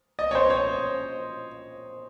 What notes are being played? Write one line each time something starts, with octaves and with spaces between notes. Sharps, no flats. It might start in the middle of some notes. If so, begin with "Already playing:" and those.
D#5
C#5
C5
C#5